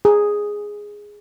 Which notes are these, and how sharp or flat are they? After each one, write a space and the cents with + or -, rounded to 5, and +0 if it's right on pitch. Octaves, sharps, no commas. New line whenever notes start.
G#4 -5